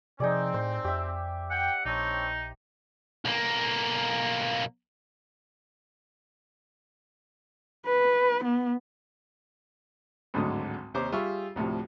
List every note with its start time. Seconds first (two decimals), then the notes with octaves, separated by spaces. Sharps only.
0.20 C3 D#3 F3 C4 D#4 G#4 D5
0.54 A2 C5
0.85 F2 G4 E5
1.50 F#5 G5
1.85 A#1 C4 D4 D#4 C#5
3.25 B1 A#3
7.86 B4
8.44 B3
10.34 G#1 D2 A2 D3 F#3 D#6
10.94 D#2 C3 C5 C#5 A#5 D6
11.12 G3 F4 G#4 E5 C#6 E6
11.56 D2 A2 C3 F3